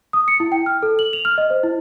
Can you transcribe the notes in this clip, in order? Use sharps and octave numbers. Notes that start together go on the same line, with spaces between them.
D#6
C#7
E4
G5
F6
A4
F#7
F7
F6
D#5
C5
E4